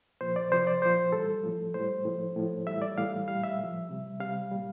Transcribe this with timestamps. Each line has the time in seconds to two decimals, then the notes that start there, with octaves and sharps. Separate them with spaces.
0.21 A#2 F3 C5
0.36 D5
0.51 C3 F3 C5
0.67 D5
0.82 A#2 F3 C5
1.12 A2 E3 G3 A4
1.43 A2 F3
1.74 A2 G3 C5
2.05 A2 F3
2.36 A2 F3
2.67 A2 E3 G3 E5
2.82 D5
2.97 A2 E3 G3 F5
3.28 A#2 G3 F5
3.44 E5
3.58 A2 F3
3.89 C3 G3
4.20 C3 G3 F5
4.51 A#2 G3